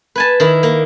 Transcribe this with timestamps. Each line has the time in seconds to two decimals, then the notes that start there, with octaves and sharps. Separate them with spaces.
0.16 B4 G#5 A5
0.40 D#3 E4
0.63 A#3